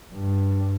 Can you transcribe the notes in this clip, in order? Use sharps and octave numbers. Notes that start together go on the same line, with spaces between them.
G2